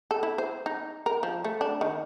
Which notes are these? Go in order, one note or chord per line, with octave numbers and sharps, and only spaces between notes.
A4
E4
C5
D#4
A#4
F3
A3
D4
D#3